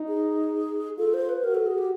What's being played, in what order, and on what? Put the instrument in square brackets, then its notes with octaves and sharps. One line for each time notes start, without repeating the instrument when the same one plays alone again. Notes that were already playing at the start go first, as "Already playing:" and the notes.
Already playing: [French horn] D#4
[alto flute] G#4
[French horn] F4 [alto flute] A4
[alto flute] C5
B4
[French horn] F#4 [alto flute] A#4
[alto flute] A4
G#4
G4